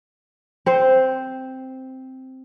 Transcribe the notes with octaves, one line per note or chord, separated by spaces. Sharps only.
C4 C5